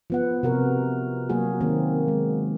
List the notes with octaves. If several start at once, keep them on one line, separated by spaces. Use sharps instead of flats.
F3 B3 F#5
C3 F#4 A#4
F#3 A#3 F#4 G#4
D#3 A#3 C4
G#3